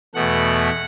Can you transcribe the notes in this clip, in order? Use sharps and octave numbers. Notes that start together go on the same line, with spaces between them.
E2 B2 A3 F#5